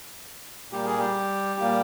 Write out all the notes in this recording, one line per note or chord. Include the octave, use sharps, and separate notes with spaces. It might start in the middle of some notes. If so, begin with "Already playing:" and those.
A#2 G3 A#3 G4
G#4
G3 G4
A#2 G3 A#3